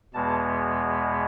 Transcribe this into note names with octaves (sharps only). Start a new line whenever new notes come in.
E2 B2 G#3 B3 A5